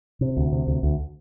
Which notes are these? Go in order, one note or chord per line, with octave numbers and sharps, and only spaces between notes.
C3
D2
C3
D2
D2